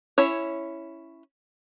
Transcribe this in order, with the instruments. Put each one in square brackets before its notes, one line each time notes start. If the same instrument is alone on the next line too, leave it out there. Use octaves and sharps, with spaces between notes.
[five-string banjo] C#4 E4 C#5